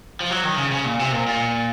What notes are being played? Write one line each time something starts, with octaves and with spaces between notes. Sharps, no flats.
F3
F#3
D#3
C#3
C#3
A#2
C3
A#2
A#2